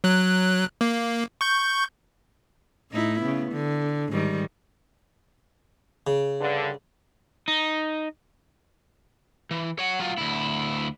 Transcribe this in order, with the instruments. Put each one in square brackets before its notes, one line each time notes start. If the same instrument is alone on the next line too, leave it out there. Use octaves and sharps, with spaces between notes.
[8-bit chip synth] F#3 F#6
A#3
C#6 G6
[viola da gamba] A2 D#4 E4
C#3 B3
D3
G#2 D#3 G3
[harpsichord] C#3
[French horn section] G2 D3
[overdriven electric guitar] D#4
E3
C#5 F#5
F#3 F4
D2 E4